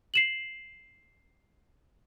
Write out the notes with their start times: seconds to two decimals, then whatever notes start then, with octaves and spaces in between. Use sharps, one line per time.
0.14 C7 E7 F#7